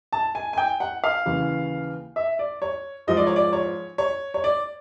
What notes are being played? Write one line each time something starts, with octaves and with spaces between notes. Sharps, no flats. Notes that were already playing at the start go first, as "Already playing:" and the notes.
A5
G#5
G#5
G5
F#5
F5
D#2 C#3 E3
E5
D5
C#5
G#2 F3 G#3 D#5
D5
C#5
D5
C#5
C#5
C#5
D5